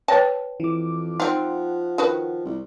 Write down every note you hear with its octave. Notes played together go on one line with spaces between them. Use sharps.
B4 C#5 G5 A5
F2 E3 D6
F3 C4 D#4 F4 F#5
D#3 F#4 B4
C2